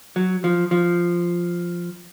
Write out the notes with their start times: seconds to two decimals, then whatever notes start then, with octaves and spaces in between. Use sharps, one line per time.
0.16 F#3
0.44 F3
0.71 F3